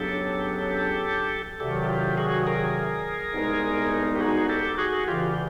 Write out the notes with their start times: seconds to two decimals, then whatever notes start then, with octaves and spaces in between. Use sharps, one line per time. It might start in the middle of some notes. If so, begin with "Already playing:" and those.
Already playing: C#2 C#3 F#3 B3 D4 G4 A4
1.60 D2 C3 D#3 F#3 G4 A4
1.89 F4 G4
2.17 F#4 G#4
2.47 G#4 A#4
3.33 C2 B2 G#3 B3 D#4
4.15 G4
4.20 F#4 G#4
4.49 G4 A4
4.78 F#4 G#4
5.07 D2 C#3 E3 F4 G4